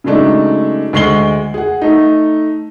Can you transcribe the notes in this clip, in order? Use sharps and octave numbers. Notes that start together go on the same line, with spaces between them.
C#3 F#3 G#3 A3 D4 D#4
D2 G#3 C#6 C7 F#7 G7
G#4 F#5
A3 D#4